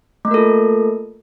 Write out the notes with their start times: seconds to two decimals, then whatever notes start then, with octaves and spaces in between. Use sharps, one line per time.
0.25 A3
0.28 A#3
0.31 A#4
0.34 A4
0.37 F4